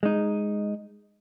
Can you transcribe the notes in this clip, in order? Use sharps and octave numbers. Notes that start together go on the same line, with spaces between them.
G#3 D#4